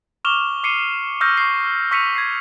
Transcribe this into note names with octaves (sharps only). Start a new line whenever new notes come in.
C#6 D6 F6 E7 F7 G7
D6 C7 C#7 D#7
C#6 E6 F6 G6 A#6
C#6 C7
C#6 E6 B6 C#7 D#7 F7
G#6 A#6 C7